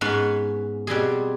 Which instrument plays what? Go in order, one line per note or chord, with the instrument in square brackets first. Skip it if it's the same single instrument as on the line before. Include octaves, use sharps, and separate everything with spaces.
[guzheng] G#2 B3 C#4 B4 F5
B2 G3 C4 G#4